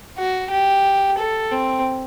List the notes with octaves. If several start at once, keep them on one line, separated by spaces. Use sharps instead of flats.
F#4
G4
A4
C4